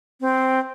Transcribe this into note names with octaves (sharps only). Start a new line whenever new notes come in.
C4